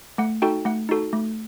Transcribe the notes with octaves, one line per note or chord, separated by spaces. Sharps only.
A3 F#5
D#4 F#4 A4 G5
A3 F#5
D#4 F#4 A4
A3